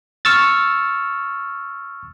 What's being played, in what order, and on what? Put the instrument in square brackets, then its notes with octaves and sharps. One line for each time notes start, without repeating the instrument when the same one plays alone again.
[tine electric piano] C#6 E6 F6 A6